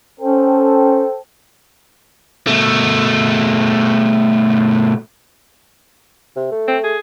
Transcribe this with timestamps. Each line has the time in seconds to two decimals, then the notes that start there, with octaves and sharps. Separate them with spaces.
0.20 C#4 A4 C5 G5
2.47 B2 A3
6.36 C3
6.51 A3
6.68 C4
6.83 G#4